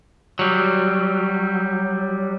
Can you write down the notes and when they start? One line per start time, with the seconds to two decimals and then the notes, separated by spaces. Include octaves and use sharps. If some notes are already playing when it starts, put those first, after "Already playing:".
0.39 F#3 G3